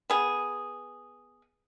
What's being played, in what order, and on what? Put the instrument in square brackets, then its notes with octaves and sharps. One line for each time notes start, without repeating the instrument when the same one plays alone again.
[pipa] B3 G#4